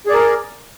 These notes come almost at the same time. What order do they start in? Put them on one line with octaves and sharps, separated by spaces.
G#4 D5 A#4